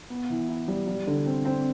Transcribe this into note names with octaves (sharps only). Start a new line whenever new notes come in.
B3
E3
E4
G3
G3
D3
C4
C4